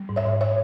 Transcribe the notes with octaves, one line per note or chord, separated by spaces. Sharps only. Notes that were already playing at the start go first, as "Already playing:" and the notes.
Already playing: G3
G#2
C#5 E5
G#2
C#5 E5